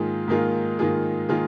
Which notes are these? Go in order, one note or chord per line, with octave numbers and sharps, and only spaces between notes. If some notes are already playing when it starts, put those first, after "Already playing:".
Already playing: G#2 D#3 A#3 F4 G#4
G#2 D#3 A#3 F4 G#4
G#2 D#3 A#3 F4 G#4
D#3 A#3 F4 G#4